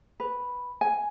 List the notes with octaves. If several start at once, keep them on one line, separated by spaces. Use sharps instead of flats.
B4
G#5